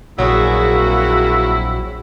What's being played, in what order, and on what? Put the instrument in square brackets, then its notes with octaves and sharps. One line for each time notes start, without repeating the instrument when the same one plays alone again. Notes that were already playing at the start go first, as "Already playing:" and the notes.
[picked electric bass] A#1 [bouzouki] F#3 C4 G#4 [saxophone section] A#3 F#4 [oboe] E4